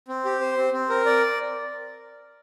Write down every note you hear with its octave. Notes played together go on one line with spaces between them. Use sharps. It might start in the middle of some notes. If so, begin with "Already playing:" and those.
C4
G4
C5
C4
C4
A#4
D5